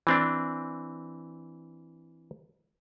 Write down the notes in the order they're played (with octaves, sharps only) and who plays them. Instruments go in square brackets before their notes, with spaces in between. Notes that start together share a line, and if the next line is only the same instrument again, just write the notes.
[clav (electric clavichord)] E3 C4 D4